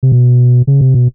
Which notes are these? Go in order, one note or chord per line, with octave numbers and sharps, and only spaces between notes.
C3
B2
C#3
C3
B2